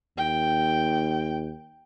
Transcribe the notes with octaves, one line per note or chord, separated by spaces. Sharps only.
D#2 G5